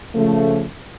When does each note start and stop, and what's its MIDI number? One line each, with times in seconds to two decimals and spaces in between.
0.15 0.65 49
0.15 0.65 53
0.15 0.65 57